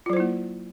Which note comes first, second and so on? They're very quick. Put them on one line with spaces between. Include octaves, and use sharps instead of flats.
F4 F#3 C5 E4 A#3